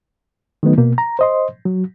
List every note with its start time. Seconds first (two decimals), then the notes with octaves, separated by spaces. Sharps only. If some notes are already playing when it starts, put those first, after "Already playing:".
0.63 D#3 F#3 A3 B3 D#4
0.78 B2 A#3
0.98 A#5
1.19 C5 D#5 C6
1.65 F#3